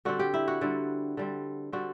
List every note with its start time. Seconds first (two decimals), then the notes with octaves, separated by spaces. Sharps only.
0.05 D3 G3 C4 F#4
0.19 G4
0.34 E4
0.48 F#4
0.61 D3 G3 C4
1.17 D3 G3 C4
1.72 D3 G3 C4 F#4